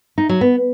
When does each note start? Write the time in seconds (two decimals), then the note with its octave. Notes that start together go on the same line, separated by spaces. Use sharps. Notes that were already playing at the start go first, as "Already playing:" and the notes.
0.18 D#4
0.29 F#3
0.41 B3